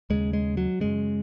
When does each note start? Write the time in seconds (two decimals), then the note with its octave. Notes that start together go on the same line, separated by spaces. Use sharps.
0.10 D#2 C#3 G#3
0.33 G#3
0.57 F#3
0.80 F#2 C#3 G#3